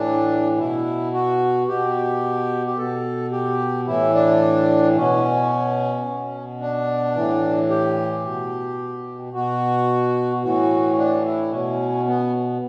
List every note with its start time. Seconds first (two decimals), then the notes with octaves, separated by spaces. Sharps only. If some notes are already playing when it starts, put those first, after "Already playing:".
Already playing: A2 E3 D4
0.59 B2 E4
1.13 F#4
1.68 B2 G4
2.67 G4
2.77 B2 A4
3.32 G4
3.86 A2 E3 E4
4.14 D4
4.96 B2 C#4
6.06 B2
6.61 D4
7.16 A2 E3
7.70 G4
8.24 B2
9.33 B2 F#4
10.43 A2 E3 F#4
10.98 D4
11.25 E4
11.52 B2 C#4
12.08 B3